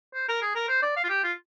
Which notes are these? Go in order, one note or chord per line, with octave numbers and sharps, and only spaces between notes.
C5
A#4
G#4
A#4
C5
D5
F5
F4
G4
F4